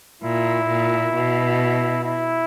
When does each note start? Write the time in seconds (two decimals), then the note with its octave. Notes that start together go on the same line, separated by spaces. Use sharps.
0.22 A#2 E4
0.68 A#2
1.13 B2
2.04 E4